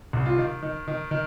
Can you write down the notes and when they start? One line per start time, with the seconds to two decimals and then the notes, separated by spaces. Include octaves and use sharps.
0.13 C2
0.26 F4
0.37 D#3
0.63 D#3
0.88 D#3
1.11 D#3